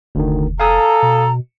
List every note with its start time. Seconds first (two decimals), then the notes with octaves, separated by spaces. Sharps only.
0.15 F1 D2 D3 D#3
0.60 A4 F5 G#5 A#5 D#6
1.02 B2